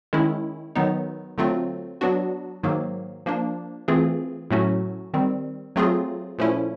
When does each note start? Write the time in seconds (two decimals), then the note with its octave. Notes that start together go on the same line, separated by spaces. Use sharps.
0.13 D#3 G#3 C#4 E4
0.76 D#3 F#3 B3 D#4
1.38 D3 F#3 A3 C4 F4
2.01 F#3 B3 D4 F#4
2.63 G#2 D#3 F#3 A#3
3.26 F3 A#3 D4
3.88 E3 A3 C4 F4 G#4
4.51 A2 F#3 A3 C#4 F#4
5.14 D#3 G3 C4
5.76 F#3 A3 C4 F4 G#4
6.38 A#2 F3 A3 C#4 E4